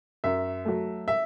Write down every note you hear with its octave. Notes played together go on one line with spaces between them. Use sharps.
F#2 E5
F#3 A3
E5